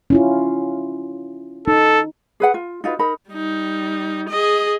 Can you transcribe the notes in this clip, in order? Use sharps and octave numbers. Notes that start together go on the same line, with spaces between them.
C#4 E4 F4
D#4 A4
G#4 B4 F#5
F4
D#4 F4 F#4 B4
D#4 A#4 B5
G3 D#4
G#4 D#5